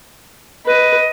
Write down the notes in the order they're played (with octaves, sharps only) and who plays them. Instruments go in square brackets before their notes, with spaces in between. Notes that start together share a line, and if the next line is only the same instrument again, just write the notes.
[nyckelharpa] B4 [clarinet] D#5